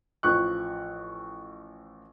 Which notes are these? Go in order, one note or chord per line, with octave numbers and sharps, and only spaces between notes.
A1 F3 C#6 F#6